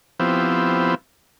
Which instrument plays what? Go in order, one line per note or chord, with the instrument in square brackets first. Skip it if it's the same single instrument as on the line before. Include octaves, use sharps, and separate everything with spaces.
[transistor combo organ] F3 B3 C4 E4 G4